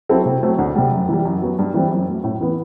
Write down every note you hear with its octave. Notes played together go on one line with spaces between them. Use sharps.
F#3 C4 E4 A4
C3
F#3 A3 C4
D2
C3 G3
F#2
E3 G3
F#2
F#3 B3 F#4
G2
E3 G3 C4 E4
F#2
F#3 A3
A2
E3 B3 E4 B4